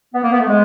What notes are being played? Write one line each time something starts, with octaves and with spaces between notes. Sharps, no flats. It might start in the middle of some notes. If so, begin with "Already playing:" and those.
B3
A#3
B3
A3
G#3